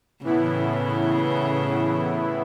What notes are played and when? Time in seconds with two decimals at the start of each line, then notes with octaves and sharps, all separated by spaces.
0.24 A2 C#3 E3 B3 E4